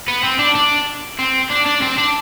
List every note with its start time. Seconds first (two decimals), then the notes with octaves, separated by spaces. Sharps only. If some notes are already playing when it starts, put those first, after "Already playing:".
0.08 B3
0.23 C4
0.39 D4
0.55 D4
1.19 C4
1.51 D4
1.66 D4
1.82 C4
1.98 D4